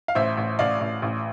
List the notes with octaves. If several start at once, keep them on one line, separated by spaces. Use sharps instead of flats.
F5
A1 C5 E5
A1
A1 D5 F5
A1
A1